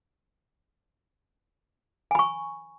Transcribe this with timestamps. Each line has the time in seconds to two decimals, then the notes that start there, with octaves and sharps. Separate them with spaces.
2.11 G#5
2.15 B5
2.19 C#6